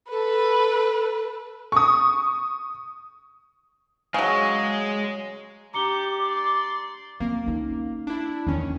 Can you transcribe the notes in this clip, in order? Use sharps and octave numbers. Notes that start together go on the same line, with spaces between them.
A4 B4
C#6 D#6
C#3 F#3 G#3
D4 G4 A#5 D6 C#7 G7
D5 C6
A#3 C4
C#4 D#4
D4 E4
E2 D#3 C#4